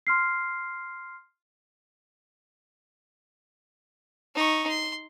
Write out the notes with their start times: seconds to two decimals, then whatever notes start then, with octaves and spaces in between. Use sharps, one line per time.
0.07 C6 F6 C7
4.35 D#4 C#6
4.69 C6